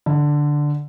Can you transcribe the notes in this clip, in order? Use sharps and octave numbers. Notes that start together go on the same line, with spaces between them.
D3